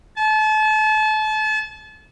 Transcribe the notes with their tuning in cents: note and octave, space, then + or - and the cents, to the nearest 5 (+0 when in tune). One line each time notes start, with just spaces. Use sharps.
A5 -35